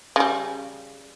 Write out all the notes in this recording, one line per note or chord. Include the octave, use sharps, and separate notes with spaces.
C#3 G3